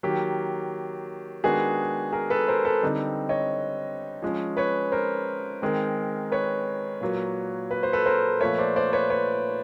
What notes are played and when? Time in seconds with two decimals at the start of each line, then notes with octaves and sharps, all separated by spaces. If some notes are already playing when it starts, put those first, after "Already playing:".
0.03 D#3 F#3 A#3 G4
1.44 D#3 G#3 B3 D4 F#4 G#4
2.12 G#4 A#4
2.30 A4 B4
2.48 A#4 C5
2.65 A4 B4
2.83 D3 G3 C4 D#4
3.29 C#5 D#5
4.22 F3 G#3 C#4
4.57 B4 C#5
4.92 A#4 C5
5.62 D#3 G#3 C4
6.32 B4 C#5
7.01 A#2 F#3 A#3
7.71 B4
7.83 C5
7.93 A4 B4
8.06 A#4 C5
8.40 A#2 F3 A3 B4 C#5
8.58 C5 D5
8.76 C5 D5
8.93 B4 C#5
9.10 B4 C#5